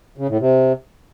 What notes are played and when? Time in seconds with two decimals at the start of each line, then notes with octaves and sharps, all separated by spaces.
0.18 C#3
0.29 A2
0.40 C3